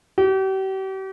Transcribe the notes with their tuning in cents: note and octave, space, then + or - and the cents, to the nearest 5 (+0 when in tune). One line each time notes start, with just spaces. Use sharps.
G4 -40